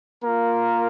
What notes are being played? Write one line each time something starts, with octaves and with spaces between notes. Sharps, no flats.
A#3 F4 A#4